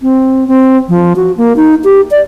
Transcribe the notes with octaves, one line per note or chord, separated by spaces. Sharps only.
C4
C4
F3
F#4
A#3
D#4
G4
D5